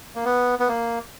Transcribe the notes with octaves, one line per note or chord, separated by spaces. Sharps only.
A#3
B3
B3
A#3